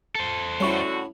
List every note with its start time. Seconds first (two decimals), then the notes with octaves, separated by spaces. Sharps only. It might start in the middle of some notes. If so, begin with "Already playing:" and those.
0.15 A4 C5
0.60 A2 D3 G3 C#4 E4 F#4 C#6